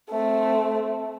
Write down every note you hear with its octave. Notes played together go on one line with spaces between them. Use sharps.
A3 C4